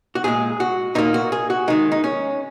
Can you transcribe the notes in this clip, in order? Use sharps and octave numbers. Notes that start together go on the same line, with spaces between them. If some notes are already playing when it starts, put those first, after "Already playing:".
F#4
A#2 G#3 G#4
F#4
A#2 A#3 D#4
F#4
G#4
F#4
D#3 G#3 D#4
D#4
C#4